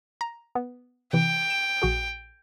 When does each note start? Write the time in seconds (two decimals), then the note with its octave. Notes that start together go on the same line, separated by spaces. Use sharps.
0.21 A#5
0.55 B3
1.13 C3 E3 G5
1.50 E7
1.82 A#1 F#4 G#4